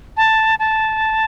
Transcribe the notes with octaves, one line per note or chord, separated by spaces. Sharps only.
A5
A5